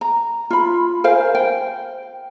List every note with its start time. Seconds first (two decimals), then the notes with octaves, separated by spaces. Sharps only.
0.01 A#5
0.50 F4 B5
1.04 A#4 C5 F5 G#5
1.35 G5